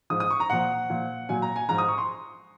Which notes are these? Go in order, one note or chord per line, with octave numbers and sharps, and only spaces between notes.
G#2 F3 D#6
D#6
C#6
A#5
A#2 F3 F#5
A#2 F3
A#2 F#3 G#5
A#5
G#5
G#2 F3 A#5
D#6
C#6
C6